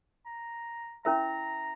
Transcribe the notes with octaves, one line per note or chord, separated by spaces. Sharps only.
A#5
C#4 E4 A#4 E5 A#5